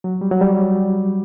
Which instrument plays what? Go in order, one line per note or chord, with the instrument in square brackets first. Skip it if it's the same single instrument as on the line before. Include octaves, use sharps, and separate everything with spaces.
[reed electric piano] F#3
G3
F#3
G3